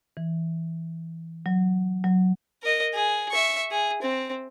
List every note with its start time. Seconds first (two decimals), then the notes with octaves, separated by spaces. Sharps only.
0.17 E3
1.46 F#3
2.04 F#3
2.63 A#4 D#5
2.94 G#4
3.31 E5 C#6
3.71 G#4
4.03 C4